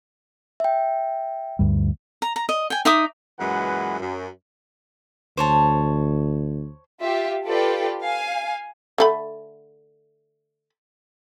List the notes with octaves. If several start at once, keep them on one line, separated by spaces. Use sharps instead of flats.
E5 G5
D2 G2 G3
A#5
A#5
D#5
G5 G#5
D#4 E5 D6 D#6
F#2 A#2 E3 G#3 B4 F#5
F#2
D2 C5 C#5 A5
F4 G4 E5
F4 G4 A4 B4 D5 G5
F5 G#5
D3 A3 B5